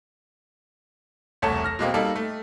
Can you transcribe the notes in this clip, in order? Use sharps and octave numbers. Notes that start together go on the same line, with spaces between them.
E1 C2 A3 C#5 F#5 A5
F6 A#6
B2 G#3 A#3 C4
G3 A#3 D#4 A4
A3